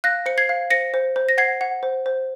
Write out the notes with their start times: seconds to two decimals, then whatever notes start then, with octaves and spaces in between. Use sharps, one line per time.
0.04 F5 F#6 A#6
0.26 C5 C#7
0.38 G#6 C7
0.49 F5
0.70 C5 A#6 C#7
0.94 C5
1.16 C5
1.29 A#6
1.38 F#5 G#6 C7
1.61 F#5
1.83 C5
2.06 C5